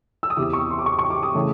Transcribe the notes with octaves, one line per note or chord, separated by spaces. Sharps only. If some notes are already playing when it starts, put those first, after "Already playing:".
E6
D#6
E2 C3 E3 D6
C#6
C6
D6
C#6
C#6
D6
D#6
C#3 E3 A3